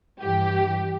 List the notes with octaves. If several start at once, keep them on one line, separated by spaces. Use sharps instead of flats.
G2 E3 G4